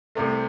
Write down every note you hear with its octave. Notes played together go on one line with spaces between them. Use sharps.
C2 C3 A3